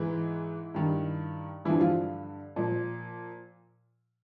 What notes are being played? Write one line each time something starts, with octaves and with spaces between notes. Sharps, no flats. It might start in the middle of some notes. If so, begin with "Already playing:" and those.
Already playing: G#2 E3 E4
G2 D#3
G2 D3 E3 F3 E4
F3 F4
A#2 F3